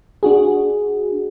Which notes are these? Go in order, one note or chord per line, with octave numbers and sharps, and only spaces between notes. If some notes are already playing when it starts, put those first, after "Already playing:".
D4 F#4 G#4